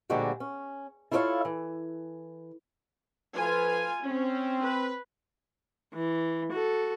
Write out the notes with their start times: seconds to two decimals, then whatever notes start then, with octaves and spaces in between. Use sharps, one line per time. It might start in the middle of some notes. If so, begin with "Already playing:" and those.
0.10 A#2 D3 F3 G3 G#3 F#4
0.40 C#4
1.11 E4 F4 A4 C#5 D5 F5
1.45 E3
3.36 F3 F4 A4 B4 G#5
4.06 C4 C#4
4.63 B4
5.94 E3
6.52 F#4 A4